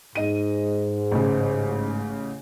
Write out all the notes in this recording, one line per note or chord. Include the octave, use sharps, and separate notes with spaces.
G#2 D#5 D#7
A1 C#3